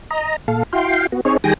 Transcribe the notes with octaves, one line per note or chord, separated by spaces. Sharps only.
D#5 A#5
A#2 A4 F5
E4 F#4 F5 G5 C6
B3 F#4
C4 D#4 G#4 C#5
D#3 G3 G#4 G5 G#5 A#6